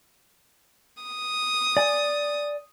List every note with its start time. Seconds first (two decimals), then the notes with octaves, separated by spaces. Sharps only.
1.03 D#6
1.77 D5 G#5